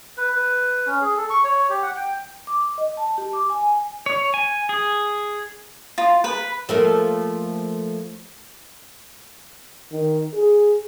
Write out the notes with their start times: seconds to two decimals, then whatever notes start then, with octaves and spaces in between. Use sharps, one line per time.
0.17 B4
0.32 B4
0.87 C#4
1.01 G#4
1.17 A4
1.30 C#6
1.44 C#5
1.70 G4
1.83 F#5
1.96 G5
2.47 D6
2.78 D#5
2.97 A5
3.18 G4
3.33 D6
3.50 G#5
4.06 C#5
4.34 G#5
4.69 G#4
5.98 F4
6.24 B4
6.69 F3 A3 A#3
9.91 D#3
10.33 G#4